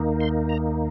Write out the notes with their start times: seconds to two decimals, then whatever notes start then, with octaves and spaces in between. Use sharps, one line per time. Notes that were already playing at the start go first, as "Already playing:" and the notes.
Already playing: D#2 D#3 A#3 D#4
0.20 C6
0.49 A#5